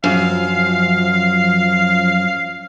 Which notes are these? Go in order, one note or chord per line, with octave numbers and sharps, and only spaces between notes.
F#2 F3 F5